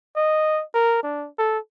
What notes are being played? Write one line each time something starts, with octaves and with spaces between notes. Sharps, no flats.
D#5
A#4
D4
A4